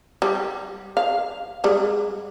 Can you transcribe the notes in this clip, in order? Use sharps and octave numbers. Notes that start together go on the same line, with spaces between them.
G3
F5
G3 G#3